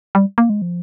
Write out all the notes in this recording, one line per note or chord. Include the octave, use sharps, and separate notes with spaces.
G3
A#3
G#3
F3